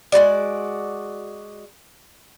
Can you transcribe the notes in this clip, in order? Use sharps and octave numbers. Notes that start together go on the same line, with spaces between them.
G#3 F4 F#4 D5